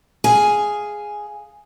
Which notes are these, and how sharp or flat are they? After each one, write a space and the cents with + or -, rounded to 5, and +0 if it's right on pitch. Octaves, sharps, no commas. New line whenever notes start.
G#4 +0 F5 +0 G#5 +0